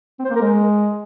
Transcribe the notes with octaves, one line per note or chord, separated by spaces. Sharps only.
C4
C5
A#3
A#4
G#3